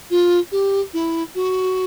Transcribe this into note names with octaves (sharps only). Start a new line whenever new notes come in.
F4
G4
E4
F#4